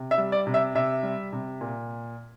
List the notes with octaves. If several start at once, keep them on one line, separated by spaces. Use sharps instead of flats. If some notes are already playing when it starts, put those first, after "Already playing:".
Already playing: C3
E5
G3
D5
C3
E5
C3 E5
G3
C3
A#2